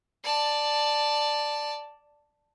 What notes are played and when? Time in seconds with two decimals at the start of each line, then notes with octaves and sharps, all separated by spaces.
0.24 D5 A5